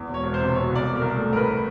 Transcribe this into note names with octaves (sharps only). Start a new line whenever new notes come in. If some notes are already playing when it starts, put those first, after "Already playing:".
Already playing: E2
E1
C#5
E1
C5
C3
B2 C#5
C2
D5
B2
A#4
C2
A2 A4
A1 A#4 B4
B4